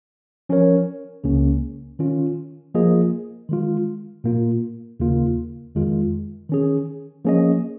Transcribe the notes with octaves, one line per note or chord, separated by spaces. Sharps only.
F3 C#4 A#4 C#5
C#2 C#3 A#3 C#4
D#3 C#4 F4
F3 A#3 F4 G#4 D#5
D#3 G#3 F4
A#2 A#3 F4
D#2 C#3 A#3 F4
F2 D#3 G#3 F4
D#3 C#4 G#4
F3 A#3 C#4 G#4 D#5